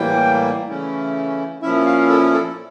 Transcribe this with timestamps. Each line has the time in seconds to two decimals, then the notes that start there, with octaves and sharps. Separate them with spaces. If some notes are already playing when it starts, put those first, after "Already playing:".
Already playing: A2 E3 G3 A#3 G5
0.69 C#3 E3 A3 C#4 E4
1.62 A#2 F3 C#4 E4 E5
1.86 F5
2.10 A4
2.33 A4